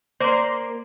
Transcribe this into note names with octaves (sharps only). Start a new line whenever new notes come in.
A#3 C5 D5 C6